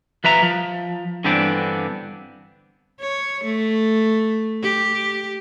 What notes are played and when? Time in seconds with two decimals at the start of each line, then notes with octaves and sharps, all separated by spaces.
0.24 F3 B4 E5 A#5
0.42 F3
1.24 G2 D3 E3 B3 C4 D4
3.01 C#5
3.44 A3
4.63 G4